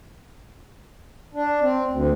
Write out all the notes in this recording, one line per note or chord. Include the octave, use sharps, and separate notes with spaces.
D4
C4
D2